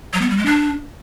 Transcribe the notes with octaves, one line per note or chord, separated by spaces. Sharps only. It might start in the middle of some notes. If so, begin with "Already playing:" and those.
F#3
B3
G3
G#3
D4